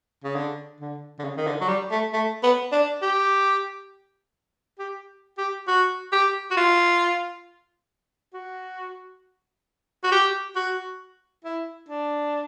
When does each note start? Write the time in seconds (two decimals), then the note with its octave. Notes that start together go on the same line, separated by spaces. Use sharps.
0.24 C#3
0.35 D3
0.80 D3
1.19 D3
1.24 C#3
1.37 D#3
1.47 D3
1.61 F#3
1.69 G3
1.91 A3
2.13 A3
2.43 B3
2.72 D4
3.02 G4
4.79 G4
5.38 G4
5.68 F#4
6.12 G4
6.51 F#4
6.57 F4
8.34 F#4
10.04 F#4
10.12 G4
10.56 F#4
11.45 E4
11.89 D4